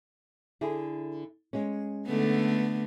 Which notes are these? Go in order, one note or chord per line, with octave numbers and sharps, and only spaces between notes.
D3 E4 G#4
G#3 C#4
D3 A3 B3